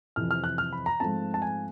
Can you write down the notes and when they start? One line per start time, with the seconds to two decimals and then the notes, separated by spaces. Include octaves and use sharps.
0.16 F2 C3 E3 F6
0.31 F6
0.44 F#6
0.58 F6
0.73 B5
0.86 A#5
1.00 G#2 F3 A3 C4 A5
1.34 A5
1.42 G#5